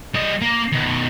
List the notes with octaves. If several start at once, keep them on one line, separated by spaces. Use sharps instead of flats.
G3 D#5
A#3
B2 D#3